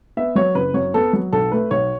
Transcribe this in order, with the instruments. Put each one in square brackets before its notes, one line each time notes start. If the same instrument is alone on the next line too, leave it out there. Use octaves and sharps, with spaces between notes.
[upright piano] B3 E5
F#3 C#5
F#1 B4
F#2 C#5
B3 A4
F#3
B1 A4
A3 B4
B1 C#5